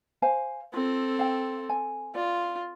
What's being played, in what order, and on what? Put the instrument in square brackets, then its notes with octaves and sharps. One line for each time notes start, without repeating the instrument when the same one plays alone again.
[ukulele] C5 F5 G#5
[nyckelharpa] C4 A4 [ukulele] F4
[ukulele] F5 G5
G#5
[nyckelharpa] F4 [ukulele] D5